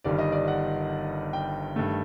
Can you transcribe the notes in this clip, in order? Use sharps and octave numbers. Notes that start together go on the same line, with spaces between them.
G1 G2 D#3 G3 D5
D#5
D5
F#5
G5
G2 D#3 A3